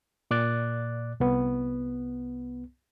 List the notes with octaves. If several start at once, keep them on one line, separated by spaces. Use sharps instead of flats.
A#2 D5 D6 F#6 A6
C2 B3